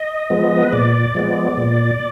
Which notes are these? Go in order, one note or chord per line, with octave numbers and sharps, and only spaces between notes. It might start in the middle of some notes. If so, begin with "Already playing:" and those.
Already playing: D#5
F3 G#3 B3
B4
A#2 D5
F3 G#3 B3
A#2